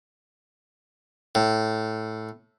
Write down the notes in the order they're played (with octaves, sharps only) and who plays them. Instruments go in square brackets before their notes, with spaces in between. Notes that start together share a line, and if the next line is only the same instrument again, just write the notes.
[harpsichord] A2